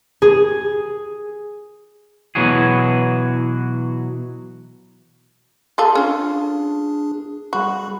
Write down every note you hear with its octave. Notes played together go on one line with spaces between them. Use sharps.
G#4
B2 E3 F#3 F#4 G#4
F4 G#4 A4
C#4 D4 F4 G#4
G3 F#4 G#4 B5